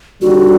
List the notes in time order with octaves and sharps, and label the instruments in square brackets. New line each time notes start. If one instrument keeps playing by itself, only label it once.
[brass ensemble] D#2 D3 G3 [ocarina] F#4